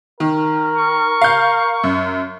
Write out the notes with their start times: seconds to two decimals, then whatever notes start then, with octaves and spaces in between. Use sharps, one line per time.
0.20 D#3 A#4
0.77 C#6
1.22 F5 G6
1.84 F#2